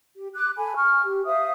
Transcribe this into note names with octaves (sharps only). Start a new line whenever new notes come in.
G4
D6 F#6
A4 G#5 B5
G#5 C#6 F6
G4
C5 E5 F5 D#6